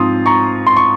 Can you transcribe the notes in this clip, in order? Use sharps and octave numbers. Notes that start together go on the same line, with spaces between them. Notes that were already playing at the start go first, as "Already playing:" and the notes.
Already playing: G#2 F3 C4 F4 C6 D#6
A#5 C#6
C6
C#6